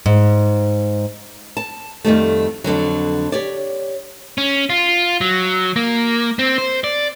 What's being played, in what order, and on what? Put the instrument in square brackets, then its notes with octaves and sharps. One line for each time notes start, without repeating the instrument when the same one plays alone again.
[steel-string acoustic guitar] G#2
[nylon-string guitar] A5
F2 D#3 G3 A3
F2 D3 D#3 F#3
G4 C#5 D5
[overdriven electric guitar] C#4
F4
F#3
A#3
C4
C5
D5